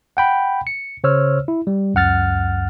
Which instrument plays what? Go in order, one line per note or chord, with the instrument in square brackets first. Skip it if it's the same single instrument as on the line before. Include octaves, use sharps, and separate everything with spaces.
[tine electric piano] F#5 G5 B5
C#7
C#3 C5 C#5 E6 F6
E4
G3
C#2 F#2 F#5 F6 A6